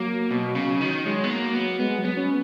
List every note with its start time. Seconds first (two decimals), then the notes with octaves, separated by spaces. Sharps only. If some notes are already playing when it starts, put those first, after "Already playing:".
Already playing: F#3 A#3
0.31 B2
0.55 C#3
0.81 D#3
1.05 F#3 G#3
1.24 B3
1.31 A#3
1.55 B3
1.80 G#3 B3
1.98 F#3
2.05 B3
2.17 C#4